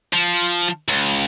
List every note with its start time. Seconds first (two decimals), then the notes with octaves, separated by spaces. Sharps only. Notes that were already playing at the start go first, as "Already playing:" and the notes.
0.13 F3
0.88 C#2